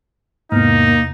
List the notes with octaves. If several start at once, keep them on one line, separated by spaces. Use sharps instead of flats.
E2 G#2 C3 A#3 B3 D#4 F6